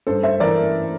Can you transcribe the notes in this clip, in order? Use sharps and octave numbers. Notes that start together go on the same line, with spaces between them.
G2 A4 C5
C5 E5
E3 A#4 D5